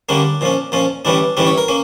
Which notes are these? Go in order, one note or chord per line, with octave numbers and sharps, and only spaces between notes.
D3 G3 A#3 C#4 D4
A#2 F3 C#4
A#2 F3 C#4
A2 E3 G3 C#4 D4
A2 E3 G3 C#4 D4
C#5
A#4
A#3 C#4